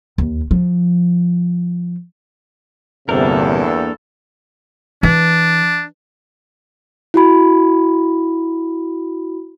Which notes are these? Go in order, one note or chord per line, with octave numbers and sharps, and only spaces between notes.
D#2
F3
G1 E2 G2 C3 A#3 D4 A4 A#4
E3 D4
E4 F#4 B5